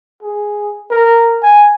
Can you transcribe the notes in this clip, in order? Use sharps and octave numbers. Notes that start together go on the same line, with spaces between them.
G#4
A#4
G#5